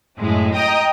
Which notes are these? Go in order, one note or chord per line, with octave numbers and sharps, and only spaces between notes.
F#2 A2 G#3
D#5 G5 A#5 D#6